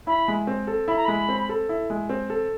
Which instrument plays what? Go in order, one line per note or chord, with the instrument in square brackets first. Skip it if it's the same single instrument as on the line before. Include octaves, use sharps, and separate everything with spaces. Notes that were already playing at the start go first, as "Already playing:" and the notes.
[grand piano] E4 [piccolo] B5
[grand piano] G#3
C4
A4
[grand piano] E4 [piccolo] B5
[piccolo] A#5
[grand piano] G#3 [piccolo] B5
[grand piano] C4
A4
E4
G#3
C4
A4